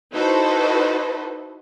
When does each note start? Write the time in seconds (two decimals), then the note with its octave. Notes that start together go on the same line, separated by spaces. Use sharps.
0.13 D#4 E4 F#4 A4 B4 C5